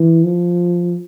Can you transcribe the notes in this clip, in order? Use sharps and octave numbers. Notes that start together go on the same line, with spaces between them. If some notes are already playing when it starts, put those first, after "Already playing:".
Already playing: E3
F3